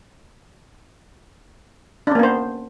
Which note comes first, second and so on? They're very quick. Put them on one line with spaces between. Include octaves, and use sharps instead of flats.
D4 C#4 A#3 B3 C5